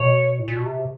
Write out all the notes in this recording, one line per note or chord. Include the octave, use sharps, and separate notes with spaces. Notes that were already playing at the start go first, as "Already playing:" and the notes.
Already playing: B2 C#5
A2
A#2
B2
C3